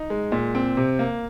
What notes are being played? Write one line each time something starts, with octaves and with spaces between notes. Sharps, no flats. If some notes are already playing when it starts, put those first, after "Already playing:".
Already playing: D#4
G#3
A#2
C4
C3
A#3